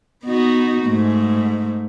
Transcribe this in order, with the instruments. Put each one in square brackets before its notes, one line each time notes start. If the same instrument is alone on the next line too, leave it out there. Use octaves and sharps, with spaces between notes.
[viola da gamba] B3 D#4 F#4
G#2 A3